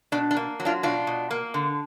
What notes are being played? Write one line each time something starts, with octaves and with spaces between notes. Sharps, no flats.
B2 D4
D4
A#3
F#3
D4 F4
B2 D4 F4
B2
A#3
D3